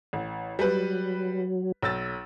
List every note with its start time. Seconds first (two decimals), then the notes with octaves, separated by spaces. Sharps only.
0.13 A1
0.59 F#3 G3 B4
1.83 B1 E6 A6